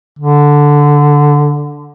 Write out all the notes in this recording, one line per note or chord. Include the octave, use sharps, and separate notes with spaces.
D3